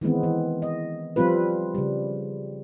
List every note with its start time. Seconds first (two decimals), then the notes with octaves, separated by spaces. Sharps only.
0.01 D#3 E3 G#3 B3 C4
0.23 E3
0.62 D#5
1.16 F3 G3 C4 F4 B4
1.75 C#3 G3